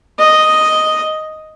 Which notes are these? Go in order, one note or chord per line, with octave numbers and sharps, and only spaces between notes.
D#5